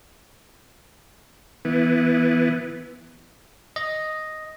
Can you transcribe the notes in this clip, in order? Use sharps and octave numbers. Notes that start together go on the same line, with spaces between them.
E3 B3
D#5